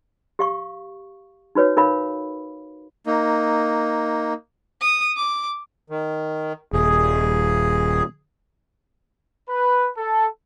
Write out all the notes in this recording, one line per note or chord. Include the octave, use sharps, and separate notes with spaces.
G4 F5 C#6
D#4 F#4 B4 C#5
D#4 A#4 C#5 F5 B5
A#3 D#4
D#6
D6
D#3
D#1 G#4
B4
A4